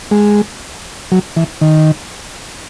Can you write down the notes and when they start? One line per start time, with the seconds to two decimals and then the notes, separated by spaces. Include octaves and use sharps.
0.11 G#3
1.12 F#3
1.37 E3
1.61 D#3